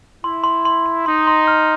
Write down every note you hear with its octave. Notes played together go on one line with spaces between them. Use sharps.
E4 C6
C6
C6
C6
D#4 C6
C6
F6